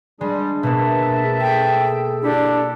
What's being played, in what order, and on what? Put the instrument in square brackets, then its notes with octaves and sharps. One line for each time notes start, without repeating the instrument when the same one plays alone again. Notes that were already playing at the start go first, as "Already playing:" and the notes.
[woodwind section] G3 [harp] G#3 [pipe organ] D4 G#4
[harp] B2 A#3 B3 [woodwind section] E5 A5
[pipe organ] G#4 A4 [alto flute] G5
[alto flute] D4 [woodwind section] E4 G4 A4